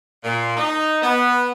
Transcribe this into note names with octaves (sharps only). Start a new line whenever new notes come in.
A#2
D#4
B3